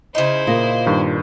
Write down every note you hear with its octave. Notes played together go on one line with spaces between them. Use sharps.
C#3 D#4 E4 C5
A#2 F4 D#5
G2 D#3